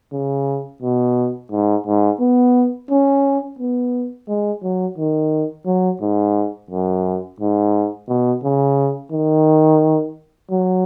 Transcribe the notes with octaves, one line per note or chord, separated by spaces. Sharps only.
C#3
B2
G#2
G#2
B3
C#4
B3
G#3
F#3
D#3
F#3
G#2
F#2
G#2
B2
C#3
D#3
F#3